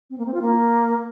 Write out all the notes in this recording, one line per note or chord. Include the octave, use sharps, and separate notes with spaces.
C4
A#3
C4
F4
A#3